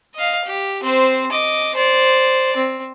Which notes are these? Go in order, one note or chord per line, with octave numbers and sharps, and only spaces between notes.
D#5 F5
G4
C4 C5
D#5 D6
C5 D5
C4